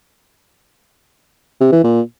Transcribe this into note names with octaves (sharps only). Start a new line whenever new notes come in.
C3
E3
A#2